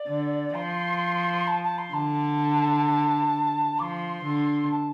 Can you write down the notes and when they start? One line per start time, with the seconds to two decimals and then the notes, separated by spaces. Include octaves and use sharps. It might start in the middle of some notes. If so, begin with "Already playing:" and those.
Already playing: D5
0.08 D3
0.54 F3 C6
1.47 A5
1.63 A5
1.78 C6
1.93 D3 A5
3.79 F3 C6 D6
4.25 D3
4.71 A5